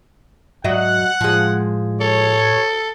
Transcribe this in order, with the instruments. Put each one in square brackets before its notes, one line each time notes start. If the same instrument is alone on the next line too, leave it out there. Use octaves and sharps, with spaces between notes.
[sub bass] G#2 [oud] F#3 D#5 E5 [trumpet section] F#5
[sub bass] A2 [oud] F3 G#3
[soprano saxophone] A4 [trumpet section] C#5